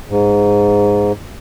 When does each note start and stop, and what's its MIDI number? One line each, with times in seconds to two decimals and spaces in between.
0.10 1.12 44